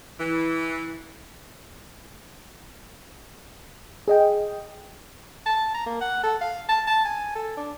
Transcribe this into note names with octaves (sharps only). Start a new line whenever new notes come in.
E3
G#4 D#5 G5
A5
A#5
A#3
F#5
A4
F5
A5
A5
G#5
A4
D4